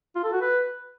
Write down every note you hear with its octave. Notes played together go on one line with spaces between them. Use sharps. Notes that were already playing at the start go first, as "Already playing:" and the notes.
F4
A4
F#4
B4